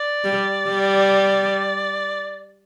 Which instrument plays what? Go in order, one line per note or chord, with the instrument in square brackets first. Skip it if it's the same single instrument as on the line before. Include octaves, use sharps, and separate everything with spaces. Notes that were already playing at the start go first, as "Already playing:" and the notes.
Already playing: [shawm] D5
[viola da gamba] G3
G3